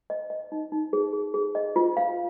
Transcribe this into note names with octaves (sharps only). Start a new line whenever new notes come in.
D#5
D#5
D#4
D#4
G#4
G#4
G#4
D#5
F4
F5